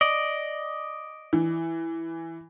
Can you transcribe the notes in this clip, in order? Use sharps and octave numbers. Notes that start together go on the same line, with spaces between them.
D5 D#5
E3